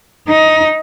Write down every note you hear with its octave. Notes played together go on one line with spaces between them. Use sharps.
D#4